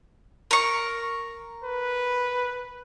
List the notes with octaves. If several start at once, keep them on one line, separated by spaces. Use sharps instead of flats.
A#4 C#6
B4